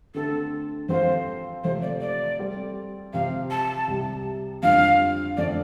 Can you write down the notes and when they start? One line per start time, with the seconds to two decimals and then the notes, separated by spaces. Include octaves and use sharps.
0.15 D3 A3 C4 A4
0.89 F3 C4 A4 C5 F5
1.64 C3 F3 A3 C5
1.82 D5
2.01 D5
2.39 G3 C4 A4
3.13 C3 F3 C4 F5
3.50 A5
3.88 C2 C3 G3
4.63 F2 D3 G3 D4 F4 F5
5.37 F2 D3 A3 D5